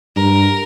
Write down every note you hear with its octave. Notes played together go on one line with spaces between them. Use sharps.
G2 A#4